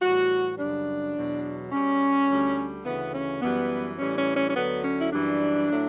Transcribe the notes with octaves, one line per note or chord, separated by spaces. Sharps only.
A2 E3 G3 F#4
F#2 C#3 G3 D4
E2 B2 F#3
B2 G3 C#4
D2 D3 G3
D2 C#3 E3 B3
C#4
F#2 E3 G3 B3
A2 E3 G3 C#4
C#4
C#4
C#4
D2 D3 F#3 B3
C#4
E4
F#2 E3 G3 D4
A2 F#3 A3